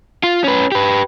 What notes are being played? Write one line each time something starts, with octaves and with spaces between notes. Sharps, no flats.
F4
C#4 B4
G4 B4